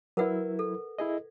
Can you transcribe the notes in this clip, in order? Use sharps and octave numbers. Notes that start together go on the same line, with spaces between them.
F#3 E4 A#4 B4 F#5
A4
E4 G#4 D#5